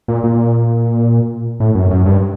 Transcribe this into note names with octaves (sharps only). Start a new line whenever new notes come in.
A#2
A#2
A2
F#2
F#2
G2